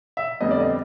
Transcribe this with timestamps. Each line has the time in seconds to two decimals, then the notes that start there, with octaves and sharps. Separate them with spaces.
0.17 E5
0.40 F2 D3 G3 B3 D#5
0.51 D5
0.60 D#5